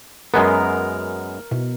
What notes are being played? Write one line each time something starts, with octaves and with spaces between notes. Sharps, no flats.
F#2 G#3 B3 A#4
B2